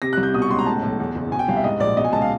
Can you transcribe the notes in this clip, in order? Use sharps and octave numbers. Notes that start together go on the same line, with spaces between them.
C3 A#6
C2 F#6
G6
B2 D#6
C#6
C#2 C6
A#5
A2 A5
B1
E2
F#1
B2 G#5
G5
C2 F5
E5
G#2 D#5
A#1 D5
B2 D#5
G#5
C#2 A5
F5